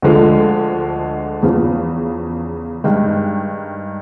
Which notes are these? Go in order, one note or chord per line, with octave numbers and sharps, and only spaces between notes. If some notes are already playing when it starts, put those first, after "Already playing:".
D2 D3 F3 G#3
E2 C#3 F3
G2 D#3 G#3